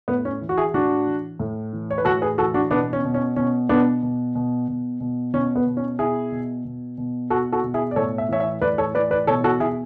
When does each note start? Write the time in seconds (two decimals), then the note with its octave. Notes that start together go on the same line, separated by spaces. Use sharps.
0.08 A2 B3
0.25 C#4
0.42 E3
0.49 F#4
0.58 E4 G#4
0.74 A2 D4 F#4
1.07 E3
1.40 A2
1.73 E3
1.91 C#5
1.98 B4
2.05 A2 F#4 A4
2.22 G#4 B4
2.38 E3 F#4 A4
2.54 D4 F#4
2.71 B2 B3 D4
2.93 C#4
3.04 B2
3.14 C#4
3.36 B2 C#4
3.69 B2 B3 D4
4.03 B2
4.35 B2
4.68 B2
5.00 B2
5.33 B2 C#4
5.56 B3
5.66 B2
5.77 C#4
5.99 B2 E4 G#4
6.32 B2
6.65 B2
6.98 B2
7.30 B2 F#4 A4
7.52 F#4 A4
7.64 B2
7.74 E4 G#4
7.91 D5
7.96 A2 A4 C#5
8.18 E5
8.29 E3 C#5 E5
8.40 C#5 E5
8.62 A2 B4 D5
8.78 A4 C#5
8.95 E3 B4 D5
9.11 B4 D5
9.27 B2 A4 C#5
9.44 F#4 A4
9.60 B2 E4 G#4